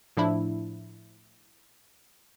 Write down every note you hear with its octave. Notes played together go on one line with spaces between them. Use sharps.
A2 F3 D4 E4